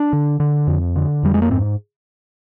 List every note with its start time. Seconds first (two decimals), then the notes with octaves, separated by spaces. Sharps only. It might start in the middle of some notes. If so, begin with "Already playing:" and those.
Already playing: D4
0.13 D3
0.40 D3
0.67 F2
0.96 D3
1.23 F2 G3
1.34 G#3
1.42 A#3
1.50 G#2 C4